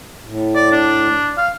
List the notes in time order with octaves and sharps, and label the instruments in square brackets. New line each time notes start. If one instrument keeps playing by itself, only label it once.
[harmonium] A2
[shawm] D5
D4
F5